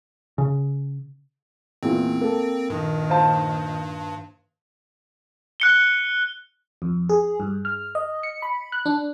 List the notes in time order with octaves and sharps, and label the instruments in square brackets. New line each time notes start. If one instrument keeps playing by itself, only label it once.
[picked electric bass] C#3
[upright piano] E2 A#2 E3 [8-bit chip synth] C4
[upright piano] A#3 A4
[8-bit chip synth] G2 [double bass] A#2 D#3
[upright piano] C5 F5 A5
[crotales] F#6 C#7 G7
[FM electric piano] F2
G#4
G2
F6
D#5
C#7
B5
F#6
D4